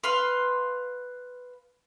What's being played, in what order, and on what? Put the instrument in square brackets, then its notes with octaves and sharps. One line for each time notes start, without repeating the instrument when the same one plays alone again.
[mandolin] B4 F5 C6